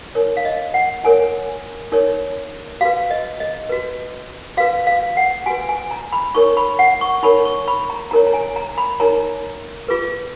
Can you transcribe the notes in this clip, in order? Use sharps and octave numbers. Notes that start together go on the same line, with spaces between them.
D#4 A#4 C#5
F5
D#5
F#5
D#4 A#4 C#5 G#5
D#4 A#4 C#5
F#4 B4 F5
D#5
D#5
F#4 B4
F#4 B4 F5
F5
F#5
F#4 B4 G#5
G#5
A#5
B5
D#4 A#4 C#5 C#6
B5
F#5
C#6
D#4 A#4 C#5 B5
C#6
B5
A#5
D#4 A#4 C#5 A#5
A#5
G#5
A#5
B5
D#4 A#4 C#5 A#5
F4 G#4 B4